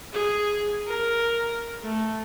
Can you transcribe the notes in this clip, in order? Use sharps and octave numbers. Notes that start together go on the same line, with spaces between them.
G#4
A#4
A3